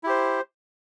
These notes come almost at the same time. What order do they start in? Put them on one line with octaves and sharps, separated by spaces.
E4 G4 C5